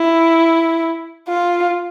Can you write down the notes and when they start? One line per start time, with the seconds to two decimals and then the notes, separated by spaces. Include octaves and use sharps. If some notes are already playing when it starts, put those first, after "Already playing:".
Already playing: E4
1.29 F4